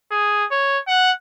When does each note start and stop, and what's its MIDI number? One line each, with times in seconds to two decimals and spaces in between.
0.12 0.45 68
0.52 0.80 73
0.88 1.11 78